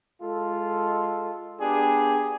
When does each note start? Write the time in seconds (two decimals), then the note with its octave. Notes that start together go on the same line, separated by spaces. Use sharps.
0.21 G#3 F4 A4
1.59 B3 D4 G4 G#4